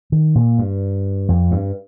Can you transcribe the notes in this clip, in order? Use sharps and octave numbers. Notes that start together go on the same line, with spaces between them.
D#3
A#2
G2
F2
G2